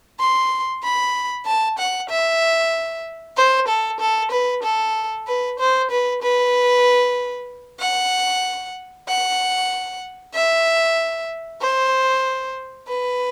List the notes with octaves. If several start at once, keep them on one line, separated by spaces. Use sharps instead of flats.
C6
B5
A5
F#5
E5
C5
A4
A4
B4
A4
B4
C5
B4
B4
F#5
F#5
E5
C5
B4